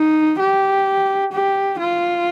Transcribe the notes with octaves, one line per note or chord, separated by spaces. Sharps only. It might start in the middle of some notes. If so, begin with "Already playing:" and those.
Already playing: D#4
G4
G4
F4